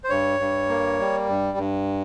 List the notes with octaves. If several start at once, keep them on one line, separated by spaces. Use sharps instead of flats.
C5
G2 C#5
G2
A#3
G3
G2
G2